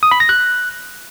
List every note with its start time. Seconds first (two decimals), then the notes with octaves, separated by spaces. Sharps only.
0.03 D#6
0.11 B5
0.20 A#6
0.29 F#6